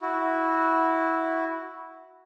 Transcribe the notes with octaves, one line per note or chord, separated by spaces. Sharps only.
E4 F#4